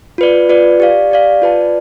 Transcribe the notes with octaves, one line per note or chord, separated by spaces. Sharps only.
F4 B4 D5
F4 B4 D5
G4 D5 F5
G4 D5 F5
F4 B4 D5 A5